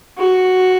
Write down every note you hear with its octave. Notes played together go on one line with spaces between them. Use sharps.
F#4